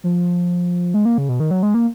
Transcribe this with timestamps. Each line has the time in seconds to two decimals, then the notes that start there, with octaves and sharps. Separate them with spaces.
0.04 F3
0.94 G#3
1.05 A#3
1.18 C#3
1.29 B2
1.40 D#3
1.51 F#3
1.63 G#3
1.74 A#3